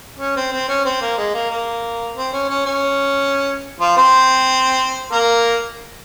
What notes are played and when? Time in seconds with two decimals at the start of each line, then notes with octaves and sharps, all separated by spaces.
0.19 C#4
0.36 C4
0.52 C4
0.69 C#4
0.85 C4
1.01 A#3
1.17 G#3
1.34 A#3
1.50 A#3
2.16 C4
2.32 C#4
2.49 C#4
2.66 C#4
3.80 F3 F4
3.97 C4 C5
5.12 A#3 A#4